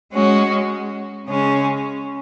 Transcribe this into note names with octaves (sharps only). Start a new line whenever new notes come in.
G#3 C#4 F#4
C#3 G#3 C#4